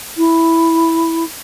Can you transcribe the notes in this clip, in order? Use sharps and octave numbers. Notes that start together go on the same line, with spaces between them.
E4